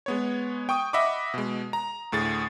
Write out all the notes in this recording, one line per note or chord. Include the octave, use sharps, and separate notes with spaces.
G#3 B3 C#5
G5 C#6 D#6
D#5 E5 F#5 B5 D6
B2 G#3
A#5
D2 A2 G#4 A6